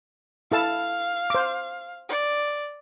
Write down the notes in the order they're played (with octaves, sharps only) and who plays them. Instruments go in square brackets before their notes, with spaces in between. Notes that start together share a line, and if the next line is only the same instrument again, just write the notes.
[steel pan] E4 A4 A5 [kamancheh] F5
[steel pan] C5 D6
[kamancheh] D5